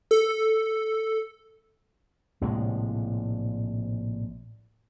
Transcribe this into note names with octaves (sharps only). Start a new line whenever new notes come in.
A4
A#1 A2 C3 G#3